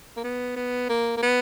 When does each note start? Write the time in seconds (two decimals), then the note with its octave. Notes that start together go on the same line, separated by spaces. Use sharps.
0.17 A#3
0.24 B3
0.56 B3
0.89 A#3
1.17 A#3
1.22 B3